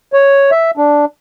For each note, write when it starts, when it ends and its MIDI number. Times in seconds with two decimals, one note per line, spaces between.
0.13 0.51 73
0.51 0.71 76
0.77 1.05 62